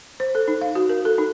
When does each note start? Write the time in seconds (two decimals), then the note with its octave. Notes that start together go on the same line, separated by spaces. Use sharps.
0.20 C5
0.35 A4
0.48 D#4
0.61 F5
0.75 F#4
0.89 A#4
1.05 A4
1.18 D#4